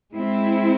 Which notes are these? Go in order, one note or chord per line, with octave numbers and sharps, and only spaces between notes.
G#3 C4 E4